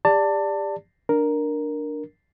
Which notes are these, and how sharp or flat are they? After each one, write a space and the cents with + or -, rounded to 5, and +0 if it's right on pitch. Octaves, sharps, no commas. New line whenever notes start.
G4 +35 D5 -5 A5 +25
D4 +5 A#4 +0